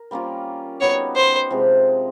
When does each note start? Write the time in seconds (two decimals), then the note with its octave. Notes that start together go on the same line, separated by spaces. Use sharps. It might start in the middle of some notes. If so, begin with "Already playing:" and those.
Already playing: A#4
0.11 G3 A#3 C#4 F4
0.81 G3 B3 D#4 F#4 C#5
1.16 C5
1.50 C3 F3 G#3